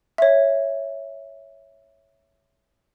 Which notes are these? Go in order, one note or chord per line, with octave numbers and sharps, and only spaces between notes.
C#5 E5